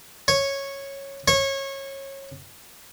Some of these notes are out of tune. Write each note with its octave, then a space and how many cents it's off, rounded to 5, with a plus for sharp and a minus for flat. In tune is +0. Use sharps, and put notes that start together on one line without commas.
C#5 -10
C#5 -25